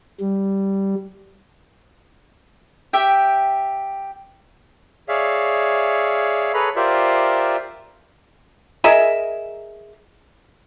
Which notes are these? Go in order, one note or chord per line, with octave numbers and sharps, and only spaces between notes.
G3
G4 E5 G5
G#4 C#5 D5 E5 F5
G#4 A4 B4 C#5 A#5 B5
F4 G4 A#4 C5 D5 E5
G#4 A#4 D#5 E5